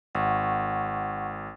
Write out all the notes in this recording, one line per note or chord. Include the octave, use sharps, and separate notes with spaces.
G#1 F#5 C#6